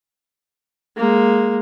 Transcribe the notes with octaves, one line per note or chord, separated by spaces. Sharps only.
G#3 A#3